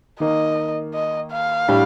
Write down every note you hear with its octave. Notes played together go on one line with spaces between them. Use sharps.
D#3 A#3 D#4 D#5
D#5
F5
A2 G3 D4 G4